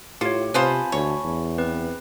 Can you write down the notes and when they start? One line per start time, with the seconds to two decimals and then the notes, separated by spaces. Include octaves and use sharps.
0.21 A2 F4 G4 C#5
0.54 C3 B3 F4 C5 G#5 A5 B5
0.92 D2 C#5
1.24 E2
1.58 C4 B4